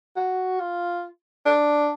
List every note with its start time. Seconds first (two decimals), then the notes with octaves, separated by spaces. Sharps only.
0.16 F#4
0.60 F4
1.46 D4